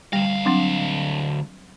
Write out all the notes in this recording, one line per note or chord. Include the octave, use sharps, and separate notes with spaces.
D2 G3 F5
F#3 C4 D4